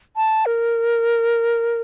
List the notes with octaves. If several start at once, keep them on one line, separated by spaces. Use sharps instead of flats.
A5
A#4